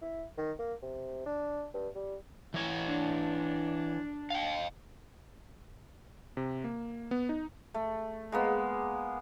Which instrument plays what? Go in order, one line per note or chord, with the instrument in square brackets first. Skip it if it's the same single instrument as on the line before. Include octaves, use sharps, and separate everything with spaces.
[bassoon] E4
D#3
A#3
C3
D4
G2
G3
[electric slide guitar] E3 C#5
[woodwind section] D4
[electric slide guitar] F5 G5
[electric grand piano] C3
A#3
B3
D#4
[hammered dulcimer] A3
G#3 A#3 B3